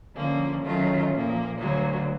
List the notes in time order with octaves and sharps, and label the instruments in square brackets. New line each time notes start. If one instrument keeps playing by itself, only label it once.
[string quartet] D3 F3 A#3 C#4
D#3 F#3 A3 C#4 F4
A#2 F3 A#3
D2 D3 F#3 A#3